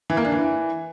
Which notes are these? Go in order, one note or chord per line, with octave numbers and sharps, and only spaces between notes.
E3
A#3
D4
E3